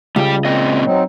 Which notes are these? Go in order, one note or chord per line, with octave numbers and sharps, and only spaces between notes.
C#2 G3 G4
A#2 C4 D#5
F#3 C4 D#4